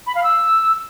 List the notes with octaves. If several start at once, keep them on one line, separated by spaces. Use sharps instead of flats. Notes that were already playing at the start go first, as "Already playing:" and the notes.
B5
F5
E6